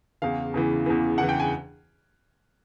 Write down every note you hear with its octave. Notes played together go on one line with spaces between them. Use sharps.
E2 C#3 E3 F5
E2 C#3 E3
E2 C#3 E3
E2 C#3 E3 F#5
G5
G#5